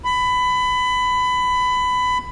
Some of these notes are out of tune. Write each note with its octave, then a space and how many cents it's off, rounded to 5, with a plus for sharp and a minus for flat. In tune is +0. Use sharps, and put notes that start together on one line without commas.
B5 +20